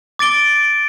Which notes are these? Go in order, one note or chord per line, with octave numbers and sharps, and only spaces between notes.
D6 A6 D7 G7